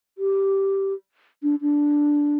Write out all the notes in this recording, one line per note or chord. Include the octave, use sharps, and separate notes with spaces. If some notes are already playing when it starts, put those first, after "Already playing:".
G4
D4
D4